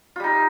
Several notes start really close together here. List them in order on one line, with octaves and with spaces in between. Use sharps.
F4 G3 D#4